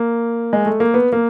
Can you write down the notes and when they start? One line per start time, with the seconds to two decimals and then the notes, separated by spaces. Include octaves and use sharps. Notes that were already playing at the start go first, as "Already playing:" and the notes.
Already playing: A#3
0.53 G#3
0.66 A3
0.80 A#3
0.94 B3
1.13 A#3